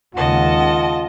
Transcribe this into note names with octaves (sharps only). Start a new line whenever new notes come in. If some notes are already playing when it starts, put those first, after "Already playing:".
D#2 C#3 G#3 F4 D#5 F#5 A5